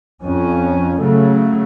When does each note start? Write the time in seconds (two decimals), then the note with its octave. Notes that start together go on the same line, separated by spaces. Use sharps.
0.24 F2 C#4
0.98 C#3 F#3 A3